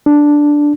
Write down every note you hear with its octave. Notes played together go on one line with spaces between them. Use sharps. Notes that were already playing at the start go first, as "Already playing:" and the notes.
D4